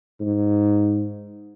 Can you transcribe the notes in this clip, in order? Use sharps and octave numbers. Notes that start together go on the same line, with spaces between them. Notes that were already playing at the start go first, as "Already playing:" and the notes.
G#2